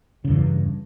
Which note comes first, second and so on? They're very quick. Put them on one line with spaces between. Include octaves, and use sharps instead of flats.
C#3 E2 G2